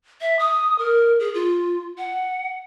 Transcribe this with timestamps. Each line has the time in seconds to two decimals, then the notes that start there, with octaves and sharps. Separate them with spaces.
0.21 E5
0.39 D#6
0.79 A#4
1.20 G#4
1.34 F4
1.98 F#5